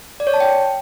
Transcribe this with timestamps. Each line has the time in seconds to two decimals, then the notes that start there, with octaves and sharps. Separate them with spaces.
0.20 D5
0.27 C#5
0.34 A5
0.40 G5